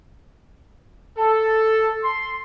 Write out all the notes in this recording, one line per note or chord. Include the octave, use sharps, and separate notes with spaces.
A4
C6